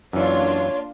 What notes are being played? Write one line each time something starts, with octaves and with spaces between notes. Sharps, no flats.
F#2 E3 A#3 D4 F4 C#5